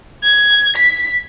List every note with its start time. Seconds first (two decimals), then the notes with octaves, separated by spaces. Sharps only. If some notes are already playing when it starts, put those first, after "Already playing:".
0.23 G#6
0.76 B6